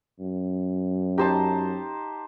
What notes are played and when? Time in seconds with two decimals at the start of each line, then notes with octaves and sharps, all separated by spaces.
0.20 F#2
1.18 D#4 G4 C5 A5